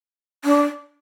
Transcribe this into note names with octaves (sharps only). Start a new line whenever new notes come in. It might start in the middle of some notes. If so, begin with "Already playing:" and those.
D4